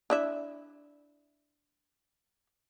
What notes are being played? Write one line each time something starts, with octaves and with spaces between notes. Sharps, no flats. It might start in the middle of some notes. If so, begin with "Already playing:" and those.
D4 E4 E5